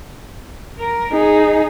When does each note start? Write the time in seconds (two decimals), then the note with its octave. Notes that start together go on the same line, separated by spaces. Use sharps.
0.79 A#4
1.12 D#4 G#4